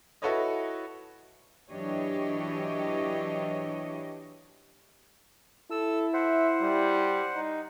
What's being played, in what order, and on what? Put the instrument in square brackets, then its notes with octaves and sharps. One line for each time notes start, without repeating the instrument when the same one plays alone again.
[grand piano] E4 F#4 A4 B4 C#5 D#5
[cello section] E3 F#3 D4 G4 C#5 D#5
[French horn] E4 [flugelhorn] A4 [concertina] E6
[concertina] C5 F#5 [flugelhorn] E5
[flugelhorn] G3
D#4